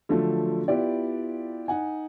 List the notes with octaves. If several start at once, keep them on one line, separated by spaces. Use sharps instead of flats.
D3 F3 F#3 A3 D4
B3 E4 F4 G4 D5
D#4 F#5 G#5